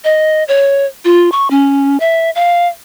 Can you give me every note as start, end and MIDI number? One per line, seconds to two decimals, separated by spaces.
0.04 0.44 75
0.48 0.86 73
1.05 1.30 65
1.32 1.50 85
1.50 1.97 61
2.00 2.30 76
2.35 2.68 77